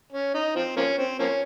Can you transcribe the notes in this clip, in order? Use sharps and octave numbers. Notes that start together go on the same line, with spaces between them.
C#4
D#4
F3 C4
F3 A#3 C#4
C4
F3 A#3 C#4